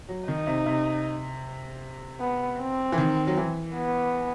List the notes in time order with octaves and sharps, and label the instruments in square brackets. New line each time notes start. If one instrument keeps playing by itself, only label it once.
[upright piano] F#3
[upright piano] D#3 [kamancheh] D#4
[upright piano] C3
C3
[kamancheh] B3
C4
[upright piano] E3
D#3
F#3
E3
[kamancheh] B3